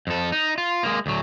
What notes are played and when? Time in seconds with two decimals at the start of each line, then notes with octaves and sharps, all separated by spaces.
0.07 F2 A4
0.32 D#4
0.58 F4
0.83 G#3 A#3
1.06 D2 F#3